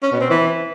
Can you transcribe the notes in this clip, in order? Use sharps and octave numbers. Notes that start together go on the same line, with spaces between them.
C#4
B2
C4
E3